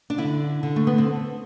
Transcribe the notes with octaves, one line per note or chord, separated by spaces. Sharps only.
D4
D3 E4
D3
A3
B3
C4